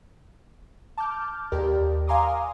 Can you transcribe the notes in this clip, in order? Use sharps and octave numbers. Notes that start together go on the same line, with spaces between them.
A5 D6 F6 G6
D#2 G4 A#4 D5
F5 G#5 A#5 C6 D6 D#6